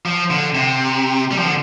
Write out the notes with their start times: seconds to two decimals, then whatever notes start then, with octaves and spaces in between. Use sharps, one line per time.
0.06 F3
0.30 D3
0.55 C3
1.31 G3
1.38 F3
1.46 D3